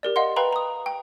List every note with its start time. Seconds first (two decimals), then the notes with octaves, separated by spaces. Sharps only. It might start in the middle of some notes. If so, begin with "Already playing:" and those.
0.03 G4 A#4 D5
0.16 D#5 F5 F#5 C6
0.36 B4 F5 G5 A#5 B5
0.53 A#5 D#6
0.86 G5